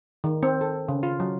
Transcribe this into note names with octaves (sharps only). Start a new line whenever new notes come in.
D#3
C4
A4
C#3
F4
F#3